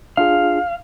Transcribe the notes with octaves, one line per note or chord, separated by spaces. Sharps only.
D4 F4 G#4 F5